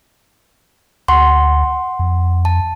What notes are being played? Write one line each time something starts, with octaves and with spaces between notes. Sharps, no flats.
D2 F#5 C6 C#6
F2
A5